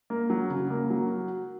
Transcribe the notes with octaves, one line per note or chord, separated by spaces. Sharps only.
A#3
F#3
C#3
A#3
F#3